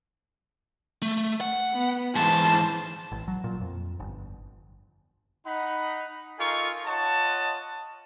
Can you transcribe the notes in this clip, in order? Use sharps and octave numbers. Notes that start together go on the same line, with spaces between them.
A3
F#5
B3
G#2 E3 C5 A5
A1
F#3
A#2
F2
G1
D#4 F#5 B5
D#4 F4 A4 A#4 G#5 C#6
F4 C#5 D#5 F#5 A5